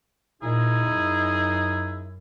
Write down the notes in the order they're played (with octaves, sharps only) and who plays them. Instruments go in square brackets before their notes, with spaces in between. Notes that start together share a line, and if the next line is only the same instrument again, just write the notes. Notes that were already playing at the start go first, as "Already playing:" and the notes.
[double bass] A#2 [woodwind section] D#4 E4 G#4
[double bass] F#2